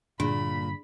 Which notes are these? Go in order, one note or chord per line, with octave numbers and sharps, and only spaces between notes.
G2 A#2 D3 A#3 D4 G#4 B5